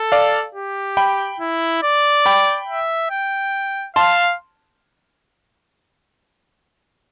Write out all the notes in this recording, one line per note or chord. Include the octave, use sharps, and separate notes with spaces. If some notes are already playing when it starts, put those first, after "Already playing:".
Already playing: A4
D5 F5
G4
G5 B5
E4
D5
G5 B5
E5
G5
F5 A5 C6